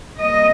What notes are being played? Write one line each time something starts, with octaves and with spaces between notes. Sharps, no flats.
C3 G3 A#3 D#5